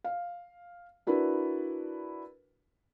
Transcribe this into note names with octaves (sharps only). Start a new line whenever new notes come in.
F5
D4 E4 F#4 A#4 B4